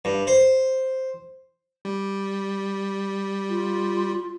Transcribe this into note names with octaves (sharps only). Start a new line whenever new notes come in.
G2
C5
G3
F4